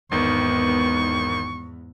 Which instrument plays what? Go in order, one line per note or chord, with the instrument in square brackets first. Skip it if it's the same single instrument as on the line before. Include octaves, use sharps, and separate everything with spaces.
[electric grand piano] G#1 D#3 [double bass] E2 G#2 [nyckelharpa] B3 [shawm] C#6